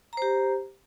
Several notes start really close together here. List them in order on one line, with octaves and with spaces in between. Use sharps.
A#5 C5 G4